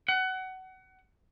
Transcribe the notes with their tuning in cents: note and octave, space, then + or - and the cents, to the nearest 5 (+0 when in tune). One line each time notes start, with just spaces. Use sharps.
F#5 +25